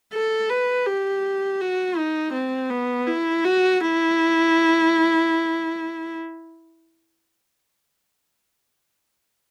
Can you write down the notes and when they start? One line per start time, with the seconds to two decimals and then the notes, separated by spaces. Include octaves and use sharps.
0.14 A4
0.50 B4
0.86 G4
1.61 F#4
1.97 D#4
2.33 C4
2.70 B3
3.07 E4
3.44 F#4
3.81 E4